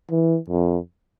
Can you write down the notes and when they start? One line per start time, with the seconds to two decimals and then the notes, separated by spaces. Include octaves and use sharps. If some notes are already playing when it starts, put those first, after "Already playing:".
0.10 E3
0.50 F2